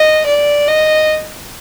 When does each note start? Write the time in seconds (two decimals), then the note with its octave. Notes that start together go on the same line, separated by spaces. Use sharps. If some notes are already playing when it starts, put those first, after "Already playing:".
Already playing: D#5
0.26 D5
0.67 D#5